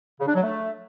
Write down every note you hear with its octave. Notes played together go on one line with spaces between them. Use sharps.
C#3
D4
F#3
A3